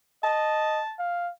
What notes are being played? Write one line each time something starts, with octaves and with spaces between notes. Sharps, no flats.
D#5 A5
F5